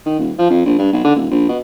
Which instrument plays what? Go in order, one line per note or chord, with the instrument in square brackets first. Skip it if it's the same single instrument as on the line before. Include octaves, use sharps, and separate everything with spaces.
[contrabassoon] D#3
D#1
F3
F2
A#1
G2
B1
D3
D#1
A#1
B2